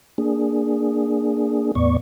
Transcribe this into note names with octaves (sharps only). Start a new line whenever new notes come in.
A#3 D4 G#4
E2 A2 B3 D5 C#6